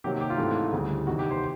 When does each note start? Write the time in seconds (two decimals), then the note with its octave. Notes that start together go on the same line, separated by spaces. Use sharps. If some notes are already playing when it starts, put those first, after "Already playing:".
0.04 C3 D#3 F#3 A#3 G4
0.21 G4
0.30 F4
0.38 G#2 E3 A3 C4
0.73 D2 C#3 E3 G3
1.07 E2 C3 D#3 F#4
1.19 G4
1.31 C5